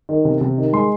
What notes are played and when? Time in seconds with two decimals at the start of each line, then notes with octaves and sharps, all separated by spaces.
0.09 D#3
0.25 C3
0.41 C3
0.58 D#3
0.73 G#3 C6